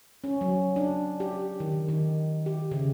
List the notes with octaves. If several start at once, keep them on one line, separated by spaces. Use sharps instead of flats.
C#4
F#3
D4
G4
D#3
D#3
G4
C#3